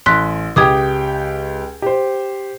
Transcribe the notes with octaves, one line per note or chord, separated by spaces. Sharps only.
A1 C6 F#6 B6
C#2 G4 G5 D6 D#6 G#6
G4 C5